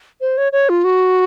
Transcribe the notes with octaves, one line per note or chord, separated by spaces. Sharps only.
C5
C#5
C#5
F4
F#4